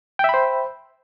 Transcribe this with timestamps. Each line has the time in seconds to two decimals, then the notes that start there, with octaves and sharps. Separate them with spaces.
0.19 G5
0.24 E5
0.29 B5
0.34 C5